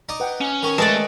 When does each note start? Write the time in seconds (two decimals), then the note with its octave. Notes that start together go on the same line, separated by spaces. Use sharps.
0.09 D#4 D5 D#5
0.20 B4 F#5 G5
0.41 C#4
0.63 D#3 C#5
0.78 G#3 A3 A4 B4 D5 D#5 A5